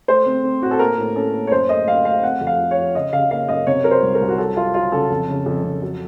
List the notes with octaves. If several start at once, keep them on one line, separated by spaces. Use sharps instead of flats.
A3 C5
C4
C4
A2 F#4
A4
A#3 A#4
A2
C#4 A4
A#3
C#5
F#2 C5
A3 D#5
F#2 F5
A3 F5
C4 F#5
F2
F5
F3
C#5
F3
C#3 D#5
C#3 F5
A#3 F5
F#2 D#5
C3 C#5
F#3 A#4
C5
C2
A#4
C2
F#4
F#3 A4
F#3 F4
F#3 F4
C#3 A4
F2
C#3
F2
F2
F#3